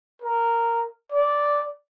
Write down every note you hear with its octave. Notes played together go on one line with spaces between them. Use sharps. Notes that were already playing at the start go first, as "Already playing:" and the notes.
A#4
D5